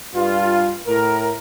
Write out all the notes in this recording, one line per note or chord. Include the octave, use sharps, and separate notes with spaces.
G2 F4
A2 A#4